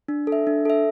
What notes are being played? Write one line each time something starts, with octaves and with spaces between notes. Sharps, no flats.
D4
A4
E5
D4
A4 E5